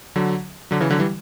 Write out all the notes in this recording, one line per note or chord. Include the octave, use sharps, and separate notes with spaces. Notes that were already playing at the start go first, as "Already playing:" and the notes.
D3 F#3
D3 F#3
C#3 E3
D3 F#3
E3 G3